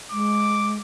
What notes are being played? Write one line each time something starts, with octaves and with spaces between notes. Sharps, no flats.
G#3 D6